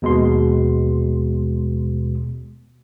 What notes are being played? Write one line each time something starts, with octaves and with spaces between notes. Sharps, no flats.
D#2 B2 G#3 C6